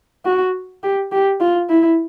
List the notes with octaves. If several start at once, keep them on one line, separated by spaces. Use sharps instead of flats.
F#4
G4
G4
F4
E4